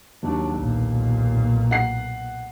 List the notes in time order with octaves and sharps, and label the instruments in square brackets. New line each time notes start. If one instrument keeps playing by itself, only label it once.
[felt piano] D#2 [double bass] F#3 D4
[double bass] B1 A#2
[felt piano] F#5 C7